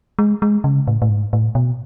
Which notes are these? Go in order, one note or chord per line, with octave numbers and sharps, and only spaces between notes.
G#3
G#3
C#3
A2
A2
G#2
A2
B2